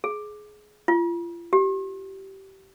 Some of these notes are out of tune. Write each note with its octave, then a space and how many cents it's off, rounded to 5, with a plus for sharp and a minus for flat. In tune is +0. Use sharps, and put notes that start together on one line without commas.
G#4 +20
F4 -35
G4 -25